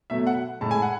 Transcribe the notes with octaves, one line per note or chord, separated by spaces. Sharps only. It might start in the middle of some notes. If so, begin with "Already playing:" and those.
B2 F#3 A3 E5
F#5
A2 G#3 A5
G#5
F#5